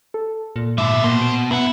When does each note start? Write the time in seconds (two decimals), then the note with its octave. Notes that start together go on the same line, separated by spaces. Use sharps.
0.14 A4
0.56 A#2
0.78 G#2 B2 D3 E5
1.04 B2 A#3 C5
1.21 D7
1.51 F#2 B3 E4 F#5